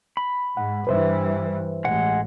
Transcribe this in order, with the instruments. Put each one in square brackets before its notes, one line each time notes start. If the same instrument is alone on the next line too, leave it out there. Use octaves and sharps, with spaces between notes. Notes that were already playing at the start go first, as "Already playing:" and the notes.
[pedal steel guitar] B5
[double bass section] G#2 [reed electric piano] F#5
[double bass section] G2 E3 [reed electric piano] B4 C5 E5
[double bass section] A1 [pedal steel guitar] G#3 F#5